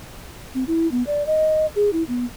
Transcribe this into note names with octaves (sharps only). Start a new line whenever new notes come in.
C4
E4
B3
D5
D#5
G#4
E4
B3